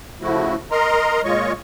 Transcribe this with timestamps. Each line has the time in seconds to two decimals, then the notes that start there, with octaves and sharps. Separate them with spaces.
0.22 C#3 F3 A3 E4 F#4
0.71 A#4 D#5 A#5 C6
1.25 A#2 G#3 F4 C#5 D#5 C#6